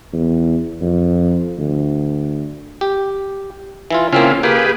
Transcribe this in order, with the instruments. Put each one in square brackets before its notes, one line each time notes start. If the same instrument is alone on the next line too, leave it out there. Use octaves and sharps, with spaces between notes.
[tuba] E2
F2
D2
[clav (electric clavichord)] G4
E3 E4 F4
[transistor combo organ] C#3 E4 F4 [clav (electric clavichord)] A#3 C4 C#4
[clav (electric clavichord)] A#3 F5 [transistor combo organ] G4 G#4 B4